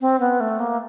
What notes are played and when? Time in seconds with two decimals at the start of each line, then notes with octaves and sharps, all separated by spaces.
0.01 C4
0.20 B3
0.40 A3
0.60 A#3